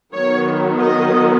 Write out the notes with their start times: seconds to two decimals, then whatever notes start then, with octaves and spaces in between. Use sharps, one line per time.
0.13 D#3 F#3 B3 C#5
0.78 D#5